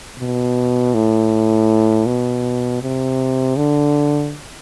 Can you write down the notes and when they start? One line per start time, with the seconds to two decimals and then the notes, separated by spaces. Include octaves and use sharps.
0.19 B2
0.94 A2
2.06 B2
2.82 C3
3.56 D3